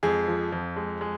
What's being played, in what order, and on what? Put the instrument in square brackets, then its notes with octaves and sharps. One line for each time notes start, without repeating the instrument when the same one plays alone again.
[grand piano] F2 [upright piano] G#3 G#4
[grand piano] F3
F2
G#3
G#3